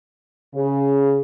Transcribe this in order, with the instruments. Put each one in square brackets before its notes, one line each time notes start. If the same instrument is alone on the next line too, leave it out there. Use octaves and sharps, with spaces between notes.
[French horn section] C#3